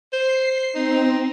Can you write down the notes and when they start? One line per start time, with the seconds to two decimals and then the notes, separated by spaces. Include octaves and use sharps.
0.13 C5 C7
0.75 C4 D#4